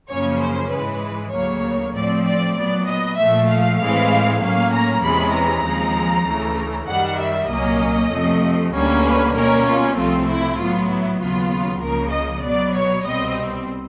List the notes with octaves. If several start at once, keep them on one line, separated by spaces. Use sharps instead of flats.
F#2 C#3 F3 A#3 C#4 C#5
C5
G#2 E3 G#3 B4
D2 C#3 F#3 A#3 C#5
A2 F3 A3 C4 D5
D5
A#2 F#3 B3 D5
D#5
A#2 F3 A3 E5
F5
A2 E3 G#3 C4 F5
A2 F#3 A#3 C#4 F5
A#5
E2 C3 E3 G#3 C#4 B5
A#5
D#2 C#3 F3 G#3 C4
D2 C#3 E3 A3
F#2 D#3 G3 F#5
E5
C2 A#2 F#3 A#3 C#4 D#5
F2 C3 F3 A3
D2 D3 G3 A#3 C#4
B4
B2 G3 A#3 C#4 A#4
F4
C2 C3 F3 A3 C4 F4
E4
A2 F#3 B3 F4
E4
D#2 C#3 F#3 B3 F4
C#2 C#3 F3 A#3 A#4
D#5
B2 F#3 B3 D5
C#5
C2 B2 G3 C4 D#5